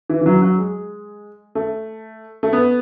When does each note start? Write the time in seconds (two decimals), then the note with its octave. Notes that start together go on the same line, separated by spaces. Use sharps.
0.10 E3
0.21 E3
0.26 F#3
0.42 F#3
0.58 G#3
1.55 A3
2.43 A3
2.53 B3